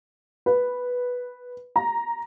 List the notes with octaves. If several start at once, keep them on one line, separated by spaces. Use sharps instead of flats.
B4
A#5